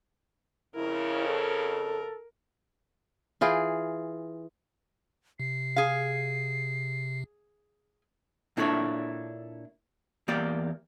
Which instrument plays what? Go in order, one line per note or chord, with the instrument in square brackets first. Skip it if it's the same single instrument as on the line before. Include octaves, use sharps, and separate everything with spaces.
[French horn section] F2 C#3 [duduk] E4 [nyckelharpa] A#4
[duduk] A4
[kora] E3 F4 G#4 G5
[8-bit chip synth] C3 [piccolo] C7
[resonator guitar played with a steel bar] G#4 F5
[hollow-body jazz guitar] A#2 D4 E4 A4 C5 C#5
E2 A#3 G4 D5